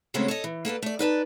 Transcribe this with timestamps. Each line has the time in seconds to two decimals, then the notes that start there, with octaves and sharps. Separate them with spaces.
0.14 C#3 F#3 G#3 A3 C4 C#4
0.28 A4 C#5 D#5
0.44 E3
0.65 A#3 A4 B4 D5
0.82 A3 D5
0.99 D#4 B4 D5 A5